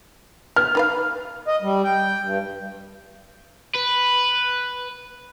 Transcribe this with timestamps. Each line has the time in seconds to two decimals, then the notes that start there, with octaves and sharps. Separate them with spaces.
0.56 B3 F6
0.75 D#3 B4 F5
1.46 D#5
1.62 G3
1.84 G5
2.24 G2
3.75 B4